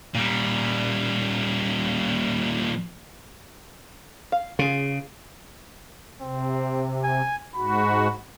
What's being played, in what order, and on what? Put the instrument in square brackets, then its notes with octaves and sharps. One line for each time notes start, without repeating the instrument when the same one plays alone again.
[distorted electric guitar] A#2 G3
[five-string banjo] F5
[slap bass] C#3 [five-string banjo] F4 G#4
[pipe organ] C3 [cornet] C4
[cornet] G#5
[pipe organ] G#2 F#4 [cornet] B5